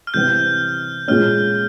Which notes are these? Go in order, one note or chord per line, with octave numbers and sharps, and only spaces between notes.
F6
C3 E3 G3 C4 G4 G6
A#2 G#3 C#4 F6